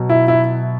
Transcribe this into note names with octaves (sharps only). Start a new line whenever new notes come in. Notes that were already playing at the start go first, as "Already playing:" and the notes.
Already playing: B2 F#3
E4
E4